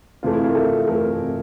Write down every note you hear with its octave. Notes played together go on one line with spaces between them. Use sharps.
F2 C3 E3 A3 F4
E4
F4
A#4
A4
F2 C3 E3 A3 A#4